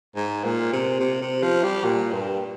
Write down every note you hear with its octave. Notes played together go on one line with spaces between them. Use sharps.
G#2
A#2
C3
C3
C3
F3
G3
A#2
G2